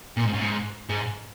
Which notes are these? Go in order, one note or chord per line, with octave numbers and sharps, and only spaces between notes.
A#2
G#2
F#2
G#2
G#2